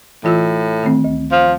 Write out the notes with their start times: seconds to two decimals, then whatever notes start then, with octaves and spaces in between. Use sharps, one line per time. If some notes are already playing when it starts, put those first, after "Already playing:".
0.24 A2 E3 F4 E6
0.83 D#3 A3 C4
1.04 D2
1.32 F3